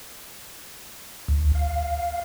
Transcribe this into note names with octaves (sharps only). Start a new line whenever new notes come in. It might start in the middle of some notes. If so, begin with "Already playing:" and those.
D2
F5